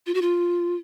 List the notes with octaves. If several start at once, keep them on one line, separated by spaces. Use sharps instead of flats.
F4
F#4
F4